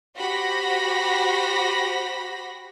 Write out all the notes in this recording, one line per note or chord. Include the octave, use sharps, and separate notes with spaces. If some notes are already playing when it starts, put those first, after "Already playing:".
F#4 G4 C5 B5 A#6 B6